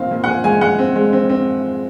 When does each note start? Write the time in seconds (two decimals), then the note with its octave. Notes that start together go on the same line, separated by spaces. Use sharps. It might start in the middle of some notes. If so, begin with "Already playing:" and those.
Already playing: A#2 C4 D#4 F5
0.11 A#2
0.24 F#5
0.27 A#2 G#5
0.44 G#3 G#5
0.61 G#3 F#5
0.79 C4
0.96 G#3
1.13 C4
1.29 C4